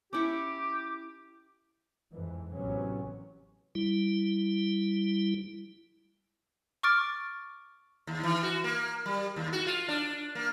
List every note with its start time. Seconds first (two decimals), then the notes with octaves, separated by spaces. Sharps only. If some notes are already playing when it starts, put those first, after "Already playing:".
0.13 C#4 E4 G4 C#6 D6
2.13 F2 G#2 E3
2.52 A1 A2 C3 F#3 B3 C#4
3.75 G3 E4
6.83 C#6 D6 F6 A6 D7
8.07 D#2
8.23 E3
8.43 F#4
8.64 A#3
9.06 G3
9.36 D#2
9.53 F#4
9.67 F4
9.88 D4
10.35 A#3